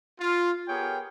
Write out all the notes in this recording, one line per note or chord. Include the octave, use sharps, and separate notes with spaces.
F4
B3 G4 G#4 A#4 C#5 G5